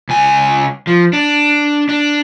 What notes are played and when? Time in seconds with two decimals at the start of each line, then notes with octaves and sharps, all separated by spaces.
0.09 C#2 G#5
0.87 F3
1.13 D4
1.89 D4